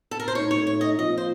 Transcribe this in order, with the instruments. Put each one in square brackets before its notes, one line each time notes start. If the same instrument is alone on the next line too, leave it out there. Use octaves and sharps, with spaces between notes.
[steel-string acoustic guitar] A4
A#4
C5
[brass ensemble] A2 A3 D#4 [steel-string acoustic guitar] C#5
[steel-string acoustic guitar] C#5
C#5
D#5
[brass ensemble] A#2 F3 C4 F4 [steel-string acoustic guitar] D#5
[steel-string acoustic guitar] C5